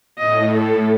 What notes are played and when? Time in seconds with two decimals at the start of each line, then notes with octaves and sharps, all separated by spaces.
0.18 A2 D#5
0.54 A4